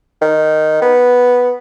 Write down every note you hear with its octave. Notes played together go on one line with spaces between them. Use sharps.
D#3
B3